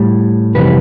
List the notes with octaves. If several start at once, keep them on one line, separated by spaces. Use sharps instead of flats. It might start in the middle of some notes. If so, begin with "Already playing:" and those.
Already playing: A2 G3
F2 C3 E3 G3 B4